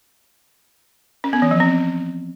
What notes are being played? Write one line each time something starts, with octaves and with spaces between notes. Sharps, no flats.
C#4
B3
E3
F3
C4